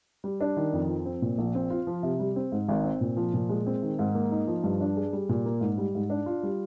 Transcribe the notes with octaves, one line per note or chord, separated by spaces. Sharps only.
G3
D4
D#3
F2
F3
C4
A#2
A#1
C4
F4
F3
C3
G3
C4
G#2
G#1
C4
A#2
F3
A#2
G#3
C4
D#3
G#2
A#3
D#4
F3
G2
D4
G#4
G3
A#2
A#3
G#2
G3
G#2
D4
F4
G3